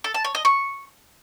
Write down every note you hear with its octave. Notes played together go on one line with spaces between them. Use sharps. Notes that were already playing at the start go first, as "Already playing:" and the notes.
A4
A5
C#5
D#5
C#6